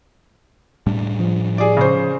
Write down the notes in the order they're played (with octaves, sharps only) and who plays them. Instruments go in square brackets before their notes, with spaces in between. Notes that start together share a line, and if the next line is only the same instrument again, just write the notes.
[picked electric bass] A2 G3 D4
[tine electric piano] F3
[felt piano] G#4 D5
C#3 C5